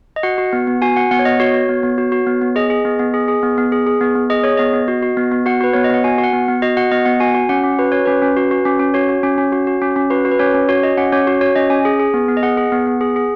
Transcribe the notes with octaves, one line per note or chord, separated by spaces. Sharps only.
D#5
F#4 F#5
F#4
B3
B3
F#4 G#5
F#4 F#5
B3 F#5
C#5
B3 D#5
F#4 C#5
F#4
B3
B3
F#4
F#4
B3
B3
G#4 D#5
G#4
B3
B3
G#4
G#4
B3
B3
G#4
G#4
B3
B3
G#4 D#5
G#4 C#5
B3 D#5
B3
F#4
F#4
B3
B3
F#4 F#5
F#4 B4
B3 C#5
D#5
B3 F#5
F#4 G#5
F#4
F#5
B3
B3
F#4 D#5
F#4 F#5
B3 D#5
B3 F#5
F#4 G#5
F#4
C#4 F#5
C#4
F#4 B4
F#4 C#5
C#4 B4
C#4
F#4
F#4
C#4
C#4
F#4 C#5
F#4
C#4
C#4
F#4
F#4
C#4
C#4
F#4 B4
F#4
B4
C#4 C#5
C#4
F#4 C#5
F#4 D#5
C#4 F#5
C#4 C#5
F#4
F#4 C#5
C#4 D#5
C#4 G#5
G#4
G#4
B3
B3
D#5
G#4 F#5
G#4
B3
B3
G#4
G#4